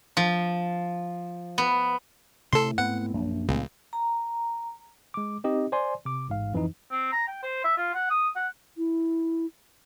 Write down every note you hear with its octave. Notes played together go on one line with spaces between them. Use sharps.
F3
B3
A2 C3 A4 C6
G#2 B3 C4 F#5
A#1 F#2
F1 C#2 A#2
A#5
G#3 D6
C4 D#4 G4 D#5
C5 D5 G#5 C6
C3 D6
A1 G#2 F5
F2 E3 F3 D#4
C4
A#5
G5
C5
E5
F4
F#5
D#6
F#5
E4